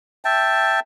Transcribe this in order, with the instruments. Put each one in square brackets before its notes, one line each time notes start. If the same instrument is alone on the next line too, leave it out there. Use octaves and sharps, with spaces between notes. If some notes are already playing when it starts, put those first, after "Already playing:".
[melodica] E5 G5 A5